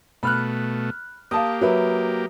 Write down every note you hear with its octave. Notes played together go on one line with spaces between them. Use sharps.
B2 A3 B5 F6 F#6
A#3 G4 F5 A5 D#6
F#3 B4 E5